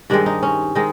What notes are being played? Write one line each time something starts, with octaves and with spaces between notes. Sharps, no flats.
G2 D#3 G#3 C4 D4
D#4
C#4
D#3 G#3 C4 D#4